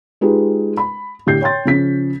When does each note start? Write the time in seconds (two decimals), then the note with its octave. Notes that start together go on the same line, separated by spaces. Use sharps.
0.21 G#3 D#4 F4 G4 G#4 B4
0.77 B5
1.26 A2 D3 G4 G6 C7
1.41 C#5 G5 C6 A6
1.65 C#3 F3 C#4 B6